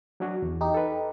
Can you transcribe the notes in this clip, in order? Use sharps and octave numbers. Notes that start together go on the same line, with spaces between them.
F#3 D4 F#4
E2
D#4 G4
A4 B4